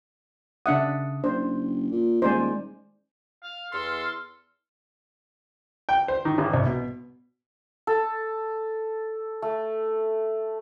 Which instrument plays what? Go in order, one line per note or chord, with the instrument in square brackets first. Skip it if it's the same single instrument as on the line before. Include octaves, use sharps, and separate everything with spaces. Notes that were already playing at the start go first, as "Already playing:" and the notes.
[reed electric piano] C#3 D#6 [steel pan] D4 E5 F#5
[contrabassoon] F#1 [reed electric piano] D4 [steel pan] C5
[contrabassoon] A#2
[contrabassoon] D#1 [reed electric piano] G#3 D#4 [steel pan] C5 D5 G#5
[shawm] F5
[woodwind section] E2 C6 F6 [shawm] A4
[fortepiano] G5
C5
D#3
G#1
C2
B2
[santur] A4
A3